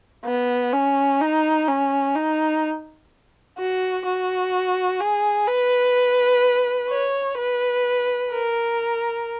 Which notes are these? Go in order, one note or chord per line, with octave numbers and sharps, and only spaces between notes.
B3
C#4
D#4
C#4
D#4
F#4
F#4
G#4
B4
C#5
B4
A#4